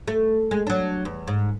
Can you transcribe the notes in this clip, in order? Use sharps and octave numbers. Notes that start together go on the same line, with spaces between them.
A3
G#3
F#3 D4
E2
G#2